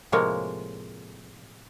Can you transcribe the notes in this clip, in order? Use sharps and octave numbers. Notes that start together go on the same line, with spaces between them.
A2 C3 F3 G#3 A#3 C#5